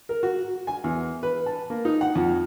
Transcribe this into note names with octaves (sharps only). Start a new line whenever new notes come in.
A#4
F#4
G#5
E2
B4
A5
A#3
D#4
F#5
F2